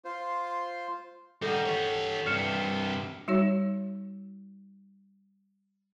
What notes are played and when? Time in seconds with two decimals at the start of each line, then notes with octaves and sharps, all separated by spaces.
0.05 F4 C5
1.42 G3 D#4 A4 F#5
1.66 G4 C#5
2.26 G2 C3 F6 C#7 E7
3.28 G3 D#4 F#4 C#5